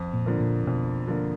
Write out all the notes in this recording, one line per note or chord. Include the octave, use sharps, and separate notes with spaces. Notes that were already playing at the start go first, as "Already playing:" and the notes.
Already playing: F2
A#2
D3 F3 A#3
A#2
F2 B2
D3 F3 A#3